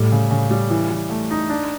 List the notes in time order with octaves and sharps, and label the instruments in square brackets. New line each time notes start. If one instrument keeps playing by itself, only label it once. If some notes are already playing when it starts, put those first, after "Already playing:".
Already playing: [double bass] A2 [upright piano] G3
[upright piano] C#3
C#3
G3
E3
E3
A3
D#4
D4